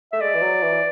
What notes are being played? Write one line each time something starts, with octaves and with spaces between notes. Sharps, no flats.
A3 E5
G#3 D5
E3
F#3
E3